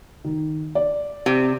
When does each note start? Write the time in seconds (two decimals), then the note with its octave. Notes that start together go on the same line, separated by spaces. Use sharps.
0.24 D#3
0.75 D5
1.26 C3